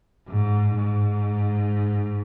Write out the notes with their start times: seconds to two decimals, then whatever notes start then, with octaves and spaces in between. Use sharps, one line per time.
0.29 G#2
0.77 G#2